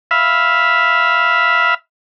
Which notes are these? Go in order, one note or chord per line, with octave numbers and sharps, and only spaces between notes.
E5 F5 B5